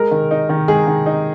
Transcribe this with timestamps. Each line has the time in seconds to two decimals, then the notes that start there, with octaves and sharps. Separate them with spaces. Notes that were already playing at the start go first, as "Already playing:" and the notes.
Already playing: G#3 A#4
0.11 D#3
0.31 D#4
0.49 D#3
0.68 G#3 G#4
0.87 D#3
1.06 D#4